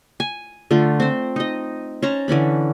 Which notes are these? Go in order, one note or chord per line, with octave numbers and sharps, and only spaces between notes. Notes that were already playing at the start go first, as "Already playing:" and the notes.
G#5
D3 A3 F4
C4 C5
D#4 D#5
C#4 C5 A5 A#5
D3 E3 C#4 B5